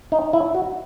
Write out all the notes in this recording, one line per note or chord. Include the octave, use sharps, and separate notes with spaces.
D#4
E4
F#4